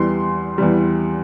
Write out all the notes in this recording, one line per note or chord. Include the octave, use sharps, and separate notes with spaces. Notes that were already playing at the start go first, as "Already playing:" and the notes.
Already playing: E2 E3 G3 C6
E2 E3 G3